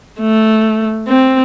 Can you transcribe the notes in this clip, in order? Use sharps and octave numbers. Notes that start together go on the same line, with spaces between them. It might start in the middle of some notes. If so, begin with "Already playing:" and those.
A3
C4